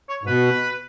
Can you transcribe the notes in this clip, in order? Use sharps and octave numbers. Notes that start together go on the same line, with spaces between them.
C#5
G#2
B2 B4